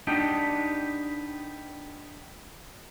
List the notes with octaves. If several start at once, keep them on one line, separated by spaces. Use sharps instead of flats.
B3 D4 D#4 G4